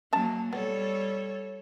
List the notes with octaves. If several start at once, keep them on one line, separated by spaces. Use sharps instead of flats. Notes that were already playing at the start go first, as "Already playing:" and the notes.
F#3 A#3 C#4 A5 A#5
G3 B3 A4 C#5